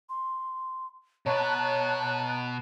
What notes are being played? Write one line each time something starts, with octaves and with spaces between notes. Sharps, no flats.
C6
B2 B4 C#5 A5 A#5 F#6